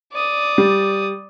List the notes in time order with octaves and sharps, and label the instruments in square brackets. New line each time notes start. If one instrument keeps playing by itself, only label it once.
[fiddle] D5 D#6
[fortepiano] G3